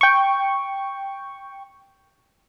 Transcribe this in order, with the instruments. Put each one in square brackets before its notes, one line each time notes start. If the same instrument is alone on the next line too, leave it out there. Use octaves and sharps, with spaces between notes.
[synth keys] G5 C#6